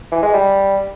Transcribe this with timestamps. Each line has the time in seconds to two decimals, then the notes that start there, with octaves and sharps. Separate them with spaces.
0.12 E3
0.23 G#3
0.34 G3